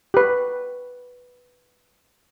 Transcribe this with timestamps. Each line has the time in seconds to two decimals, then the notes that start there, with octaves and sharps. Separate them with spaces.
0.14 G4 B4